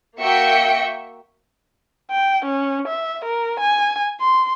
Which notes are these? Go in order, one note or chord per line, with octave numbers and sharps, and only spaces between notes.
A#3 F#4 E5 G5 C#7
G5
C#4
E5
A#4
G#5
C6